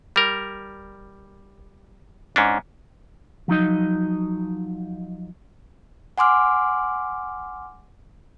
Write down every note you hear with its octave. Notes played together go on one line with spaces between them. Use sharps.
G3 A#4
G#2 C#4 D4
F3 F#3 D#4 D#5
F#5 G#5 C6 D6 F6